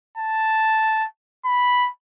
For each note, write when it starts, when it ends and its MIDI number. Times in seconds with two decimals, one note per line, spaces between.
0.18 1.06 81
1.46 1.90 83